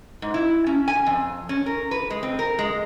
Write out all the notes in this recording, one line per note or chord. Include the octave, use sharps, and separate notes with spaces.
G#2
E4
C#4
G#5
F2
C#4
A#4
B4
G#3
C4
A#4
G#3